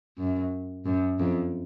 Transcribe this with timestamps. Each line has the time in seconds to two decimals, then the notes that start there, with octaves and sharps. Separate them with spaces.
0.18 F#2
0.85 F#2
1.19 F2